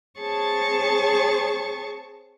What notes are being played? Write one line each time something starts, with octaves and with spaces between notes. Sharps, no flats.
C4 G#4 C#5 A5 C#6 A6